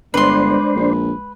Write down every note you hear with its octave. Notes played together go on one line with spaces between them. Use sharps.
G1 G#3 D4 B4 C5 C6
A#1